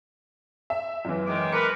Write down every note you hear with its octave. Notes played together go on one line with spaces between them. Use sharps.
E5
F#2 E3
D#3 G#3 D6
A#4 B4 C#7